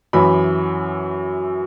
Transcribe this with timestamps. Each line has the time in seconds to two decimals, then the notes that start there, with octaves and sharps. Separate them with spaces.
0.13 F#2 E3 B5